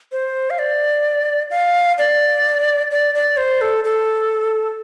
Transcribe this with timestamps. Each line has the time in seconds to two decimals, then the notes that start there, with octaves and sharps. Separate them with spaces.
0.12 C5
0.50 F5
0.59 D5
1.51 F5
1.98 D5
2.91 D5
3.15 D5
3.37 C5
3.61 A4
3.84 A4